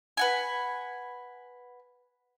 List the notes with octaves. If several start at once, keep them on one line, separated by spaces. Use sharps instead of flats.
B4 F#5 G#5